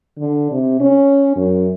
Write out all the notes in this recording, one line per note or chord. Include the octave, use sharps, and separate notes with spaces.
D3
C3
C#4
F#2